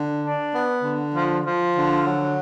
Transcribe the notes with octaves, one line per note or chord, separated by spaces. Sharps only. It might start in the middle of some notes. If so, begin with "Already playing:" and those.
Already playing: D3
D4
B3
D3
F3
F3
D3
F#3